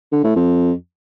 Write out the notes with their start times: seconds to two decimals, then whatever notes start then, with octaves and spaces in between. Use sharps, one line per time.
0.12 D3
0.24 A2
0.36 F2